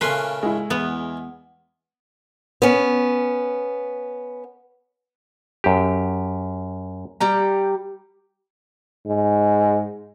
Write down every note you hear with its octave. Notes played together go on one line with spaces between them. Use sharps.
A#2 C#3 A3 B4 C6
G#3 E4
E2 B3
B3 C#4
F#2 G4
G3 G4 A#5
G#2